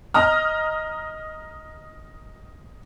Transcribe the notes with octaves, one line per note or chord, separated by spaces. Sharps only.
D#5 A#5 F6